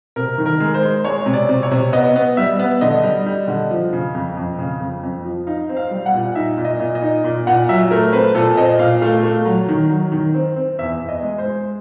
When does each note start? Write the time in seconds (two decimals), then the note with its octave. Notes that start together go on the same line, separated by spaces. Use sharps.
0.16 C3 A#4
0.38 D#3
0.46 A#4
0.60 G#3
0.74 C5
0.83 G#3
1.05 G#3 C#5
1.26 C3
1.33 D5
1.49 C3
1.63 C#5
1.71 C3
1.93 B3 D#5
2.16 B3
2.37 G3 E5
2.59 B3
2.81 D3 D#5
3.03 G3
3.26 G3
3.48 D3
3.71 F3
3.93 C#3
4.15 F2
4.37 F2
4.58 C#3
4.80 F2
5.03 F2
5.25 F3
5.47 D#4 F5
5.69 C4
5.76 F5
5.91 G3
6.06 F#5
6.14 A#2
6.35 D#4 E5
6.58 A#2
6.65 D#5
6.80 A#2
6.95 D#5
7.03 D#4
7.24 A#2
7.47 A#2 F#5
7.69 F#3 E5
7.91 A3 A#4
8.13 C4 B4
8.35 A#2 A4
8.57 C4 D#5
8.79 A#2 F5
9.02 A3 F5
9.23 A3
9.45 F#3
9.69 D#3
9.90 F#3
10.12 D#3
10.34 C4
10.56 C4
10.78 E2 E5
11.01 E2
11.09 D#5
11.23 G#3
11.38 C5
11.46 G#3